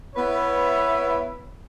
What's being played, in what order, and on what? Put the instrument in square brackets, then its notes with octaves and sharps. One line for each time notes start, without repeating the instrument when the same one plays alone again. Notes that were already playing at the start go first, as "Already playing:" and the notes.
[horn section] B3 E4 B4 C#5 E5